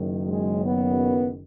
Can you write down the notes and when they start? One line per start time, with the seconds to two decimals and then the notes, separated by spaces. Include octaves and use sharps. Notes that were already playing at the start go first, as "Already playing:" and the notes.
Already playing: F#1 F#2 D#3
0.27 G#3
0.64 B3